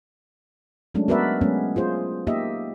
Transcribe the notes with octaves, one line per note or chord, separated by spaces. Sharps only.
F#3 G#3 A3 C#4 D4
B3 F#4 A#4 B4 D5 E5
F#3 G#3 A3 B3 C#4
F4 G#4 C5
A#3 D#4 G4 D#5 E5